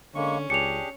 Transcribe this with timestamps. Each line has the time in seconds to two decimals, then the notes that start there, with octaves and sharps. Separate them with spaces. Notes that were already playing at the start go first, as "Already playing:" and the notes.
0.15 D3 G#3 A#3 C#4 C#6
0.50 C#2 D4 G4 G#4 C#7 F7